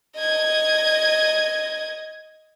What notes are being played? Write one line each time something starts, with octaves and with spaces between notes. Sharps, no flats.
D#5 G#6